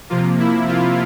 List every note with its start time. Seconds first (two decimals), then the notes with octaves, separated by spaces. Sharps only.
0.09 C3 F3 A#3 F4
0.39 E4
0.68 F4